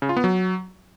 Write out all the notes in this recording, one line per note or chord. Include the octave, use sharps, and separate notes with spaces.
C#3
F4
B3
F#3